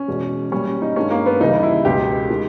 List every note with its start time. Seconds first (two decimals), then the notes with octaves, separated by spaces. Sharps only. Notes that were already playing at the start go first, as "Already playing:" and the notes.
Already playing: C#4
0.08 E2 B2 G#3
0.52 A#2 G3 C#4
0.82 D#4
0.96 G2 D#3 G#3 C#4
1.11 A#3
1.26 B3
1.41 D#2 C#3 E3 G3 D#4
1.63 E4
1.85 C#2 B2 G#3 G4
2.30 D#3 G#3